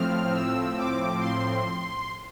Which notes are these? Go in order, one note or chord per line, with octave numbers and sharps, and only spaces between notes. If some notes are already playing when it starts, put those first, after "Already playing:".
Already playing: A2 F3 C4 F6
E6
D6
C6